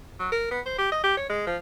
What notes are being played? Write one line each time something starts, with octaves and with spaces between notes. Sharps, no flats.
F#3
A#4
B3
C5
G4
D#5
G4
C#5
G#3
F3